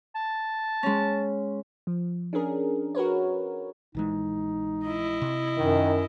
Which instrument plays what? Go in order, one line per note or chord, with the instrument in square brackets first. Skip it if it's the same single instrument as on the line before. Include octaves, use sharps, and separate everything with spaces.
[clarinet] A5
[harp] G#3 C#4
[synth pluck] F3
C#4 D4 G#4 A#4
F#4 A#4 B4 C#5
[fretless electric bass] A#1 E3 G#3 [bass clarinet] D#4
[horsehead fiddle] E4 D#5
[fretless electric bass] C3
[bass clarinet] F#2 [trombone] D#3